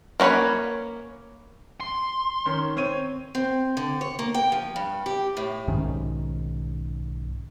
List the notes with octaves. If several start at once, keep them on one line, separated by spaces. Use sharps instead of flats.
A#3 C#4 F#4 B4 C#5
C6
D#3 C#4
C4 C#5 D#7
C4
D3
C#5
A#3
G5
F3
G2
G4
A2
B1 G#2 D#3 C#4